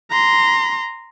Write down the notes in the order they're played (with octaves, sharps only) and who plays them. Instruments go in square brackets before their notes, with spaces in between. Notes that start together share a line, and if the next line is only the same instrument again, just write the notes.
[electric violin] A#5 C6